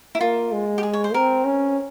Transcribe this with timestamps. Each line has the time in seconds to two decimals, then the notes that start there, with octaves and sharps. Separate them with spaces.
0.15 E4
0.21 A#3 F4
0.52 G#3
0.78 G4
0.83 G#4
0.93 C#5
1.04 C5
1.14 C4 A#4
1.45 C#4